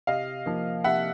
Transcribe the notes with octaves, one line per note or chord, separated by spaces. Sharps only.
C3 D#5 F5
F3 A#3
C3 E5 F#5